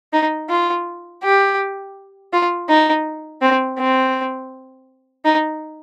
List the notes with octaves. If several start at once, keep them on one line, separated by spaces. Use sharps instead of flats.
D#4
F4
G4
F4
D#4
C4
C4
D#4